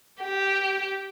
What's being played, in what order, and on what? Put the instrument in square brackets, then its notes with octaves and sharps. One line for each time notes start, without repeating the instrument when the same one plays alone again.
[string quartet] G4